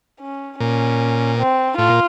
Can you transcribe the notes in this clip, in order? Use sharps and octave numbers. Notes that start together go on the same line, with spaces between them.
C#4
A#2 C#4
C4
A2 F4
A#2